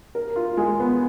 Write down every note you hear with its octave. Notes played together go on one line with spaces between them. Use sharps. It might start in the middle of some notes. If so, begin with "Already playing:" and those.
A#4
F4
G#3
B3